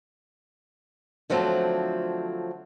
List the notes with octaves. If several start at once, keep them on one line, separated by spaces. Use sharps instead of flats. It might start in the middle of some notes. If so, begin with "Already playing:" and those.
D3 F3 F#3 A3 C4